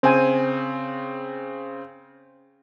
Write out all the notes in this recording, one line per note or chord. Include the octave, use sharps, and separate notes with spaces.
C#3 C4 C5 G#5